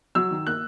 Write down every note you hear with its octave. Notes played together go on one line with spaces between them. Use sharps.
F#3 E6
D#3
A#3 F#6